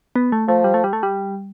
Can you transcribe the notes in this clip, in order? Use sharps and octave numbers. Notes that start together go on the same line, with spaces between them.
B3
A3
F3 A3
G3
A3
G3
A3
G3